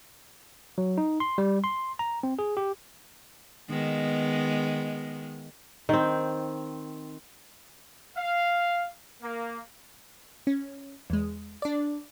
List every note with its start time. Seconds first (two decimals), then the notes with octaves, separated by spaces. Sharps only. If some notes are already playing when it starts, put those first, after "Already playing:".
0.78 F#3
0.98 D#4
1.20 C6
1.38 G3
1.64 C6
1.99 A#5
2.23 C4
2.39 G#4
2.57 G4
3.69 D#3 G#3 B3
5.89 D#3 C4
8.16 F5
9.21 A#3
10.47 C#4
11.10 E2 G#3
11.62 D4 D5